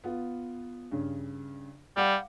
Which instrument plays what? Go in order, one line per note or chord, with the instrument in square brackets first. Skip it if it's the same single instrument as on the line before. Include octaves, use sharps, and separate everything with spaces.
[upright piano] B3 F4
G2 C#3
[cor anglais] G3 [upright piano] F5 F#5 D6